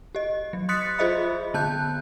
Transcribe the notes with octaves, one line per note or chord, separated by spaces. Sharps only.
G4 D#5
F#3
C6 D#6 F#6 A6 B6 C#7
F4 G#4 C5 D#5 E5 B5
D3 B3 A5 F#6 G6